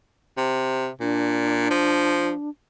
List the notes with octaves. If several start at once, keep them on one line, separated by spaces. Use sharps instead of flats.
C3
A#2 D4
F3